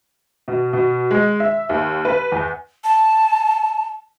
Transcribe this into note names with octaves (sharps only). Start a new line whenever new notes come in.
B2
B2
G#3
E5
D#2
B4
E2
A5